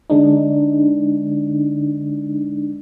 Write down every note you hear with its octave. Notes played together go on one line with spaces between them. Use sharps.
D3 G#3 D4 D#4